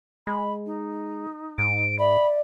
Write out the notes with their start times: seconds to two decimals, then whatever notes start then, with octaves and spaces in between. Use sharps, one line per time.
0.27 G#3 B5
0.66 D#4
1.58 G#2 D7
1.99 D5 E5 B5